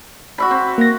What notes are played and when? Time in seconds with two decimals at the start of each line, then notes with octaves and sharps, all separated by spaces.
0.38 F#4 E5 B5
0.51 C4
0.78 A#3 A#6